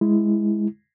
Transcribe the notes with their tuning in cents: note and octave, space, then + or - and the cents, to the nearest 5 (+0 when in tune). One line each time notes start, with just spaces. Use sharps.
G#3 +0 E4 +0